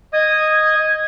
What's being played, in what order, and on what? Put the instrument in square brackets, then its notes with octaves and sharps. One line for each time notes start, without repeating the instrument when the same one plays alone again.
[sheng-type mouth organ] D#5 D#6 [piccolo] G#6